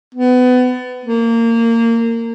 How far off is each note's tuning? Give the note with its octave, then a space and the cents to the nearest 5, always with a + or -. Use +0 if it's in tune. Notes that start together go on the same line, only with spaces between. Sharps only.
B3 +25
A#3 -20